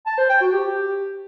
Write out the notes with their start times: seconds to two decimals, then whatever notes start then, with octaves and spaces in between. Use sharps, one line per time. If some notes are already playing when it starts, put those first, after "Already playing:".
0.06 A5
0.18 C5
0.29 G5
0.41 F#4
0.52 G4